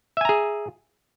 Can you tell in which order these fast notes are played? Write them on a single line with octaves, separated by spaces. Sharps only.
E5 G#5 A#5 G#4